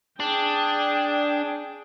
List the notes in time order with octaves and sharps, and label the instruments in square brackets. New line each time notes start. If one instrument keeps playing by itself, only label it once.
[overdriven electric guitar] D4 [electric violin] G#4 G5